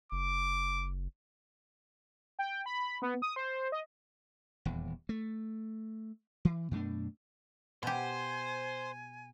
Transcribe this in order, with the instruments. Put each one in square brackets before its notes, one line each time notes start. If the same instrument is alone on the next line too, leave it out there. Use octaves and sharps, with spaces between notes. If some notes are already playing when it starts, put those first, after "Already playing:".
[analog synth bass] F#1 [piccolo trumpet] D6
[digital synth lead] G5
B5
B3
D#6
C5
D#5
[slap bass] D#1 E2
A3
E3
F#2 B2 A3 D4
[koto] B2 G4 [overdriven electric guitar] C5 [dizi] G#5